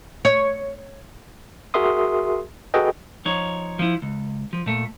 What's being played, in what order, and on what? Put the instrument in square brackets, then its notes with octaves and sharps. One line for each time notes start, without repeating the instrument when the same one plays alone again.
[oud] C#5
[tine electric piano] F#4 G#4 A#4 E5 C6 D#6
F#4 G#4 A4 B4 D#5 G5
[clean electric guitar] F3 D#4 C#5
F3 E4
C#2
F3
A#2 A3